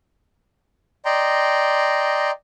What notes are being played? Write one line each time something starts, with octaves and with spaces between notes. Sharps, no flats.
D5 D#5 G5 A#5 C6